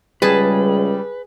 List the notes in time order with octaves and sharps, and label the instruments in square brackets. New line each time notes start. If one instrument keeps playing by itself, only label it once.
[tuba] C#2 [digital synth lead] G3 [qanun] G#4 A5 [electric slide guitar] B4